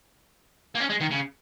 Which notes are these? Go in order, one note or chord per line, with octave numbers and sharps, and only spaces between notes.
A#3
C#4
G#3
D#3
C#3